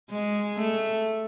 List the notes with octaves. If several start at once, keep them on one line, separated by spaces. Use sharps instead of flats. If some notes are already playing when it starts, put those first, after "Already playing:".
G#3
A3